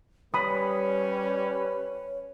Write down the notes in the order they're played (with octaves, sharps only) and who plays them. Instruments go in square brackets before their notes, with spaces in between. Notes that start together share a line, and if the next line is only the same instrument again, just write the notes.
[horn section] G3 C#4 [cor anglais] B4 [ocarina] C#5 [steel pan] B5 D#6